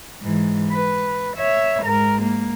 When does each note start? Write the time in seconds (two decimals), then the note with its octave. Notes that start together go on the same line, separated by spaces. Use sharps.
0.22 G#2 E3
0.72 B4
1.37 C#5 E5
1.83 G#2 A#4
2.23 A#3